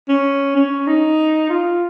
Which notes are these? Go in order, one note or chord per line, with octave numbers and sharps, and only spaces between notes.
C#4
C#4
D#4
F4